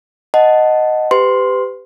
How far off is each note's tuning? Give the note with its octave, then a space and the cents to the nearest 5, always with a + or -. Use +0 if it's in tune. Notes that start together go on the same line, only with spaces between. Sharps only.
D#5 +0 F#5 +0 A5 +0
G4 +5 B4 +35 C6 +0